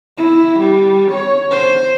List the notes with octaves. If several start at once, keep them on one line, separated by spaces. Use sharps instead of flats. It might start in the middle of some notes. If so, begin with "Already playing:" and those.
E4
G3
C#5
C5